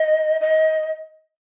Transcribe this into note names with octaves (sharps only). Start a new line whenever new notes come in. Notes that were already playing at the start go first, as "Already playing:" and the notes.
Already playing: D#5
D#5